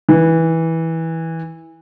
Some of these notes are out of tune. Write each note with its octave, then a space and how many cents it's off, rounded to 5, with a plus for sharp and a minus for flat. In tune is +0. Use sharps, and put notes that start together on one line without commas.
E3 -15